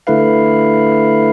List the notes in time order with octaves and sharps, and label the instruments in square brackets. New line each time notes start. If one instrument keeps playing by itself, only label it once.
[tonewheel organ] D3 A3 E4 B4 F5